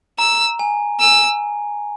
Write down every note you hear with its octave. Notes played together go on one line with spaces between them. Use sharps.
A#5 E6
G#5
G#5 E6